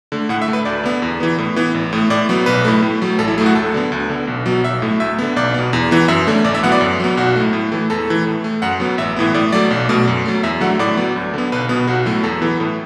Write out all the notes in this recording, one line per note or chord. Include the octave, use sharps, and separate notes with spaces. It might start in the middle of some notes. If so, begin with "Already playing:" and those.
D3 A3
A2 F#5
E5
A3
B4
D2 D5
D3 B3
E2
E3 B3
A2
E3 B3
A1
A2 A3
A2 D5
F#3 B3
B1 B4
A2 A3
A2
F#3 A3
A1 A4
E4
A2 F#3 A3
F#4
D2 A4
D3 B3
D2
D3 B3
B1
B2 F#3 B3
B1 E5
A2 A3
D2 E5
D3 B3
B1 D5
B2 B3
E2
E3 B3
F#2 E5
D3 A3
A1 D5
E5
A2 F#3 B3 F#5
D5
F#2
F#3 B3
B1 F#4
A2 A3
A2
E3 A3
E2 A4
E3 A3
A2
A3
F#2 F#5
F#3 B3
A1 E5
A2 E3 B3
A2 D5
F#3 A3 D5
B1
B2 A3
F#2
F#3 A3
E2 E5
D3 F#3 A3 F#5
A2 D5
F#3 B3
D2
D3 B3
B1 B4
B2 B3
B1 F#4
A2 F#3 A3
E2 A4
E3 B3
A2